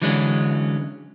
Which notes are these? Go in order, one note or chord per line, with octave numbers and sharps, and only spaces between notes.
D3 E3 F#3 G#3 C4 C#4